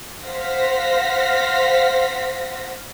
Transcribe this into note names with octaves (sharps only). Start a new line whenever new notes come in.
C5 F5 F#5 A#6 B6